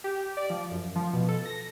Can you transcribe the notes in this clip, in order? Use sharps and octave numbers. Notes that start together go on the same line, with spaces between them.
G4
D5
F3
F#2
F3
B2
A4
A#6